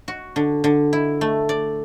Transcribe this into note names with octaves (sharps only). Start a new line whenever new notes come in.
F#4
D3
D3
E4
A3
D5